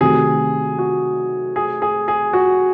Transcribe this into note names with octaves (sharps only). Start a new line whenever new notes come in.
C3 D#3 F#3 A3 G#4
F#4
G#4
G#4
G#4
F#4